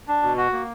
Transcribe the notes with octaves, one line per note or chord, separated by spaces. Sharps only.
D4
B2
F#4
A#3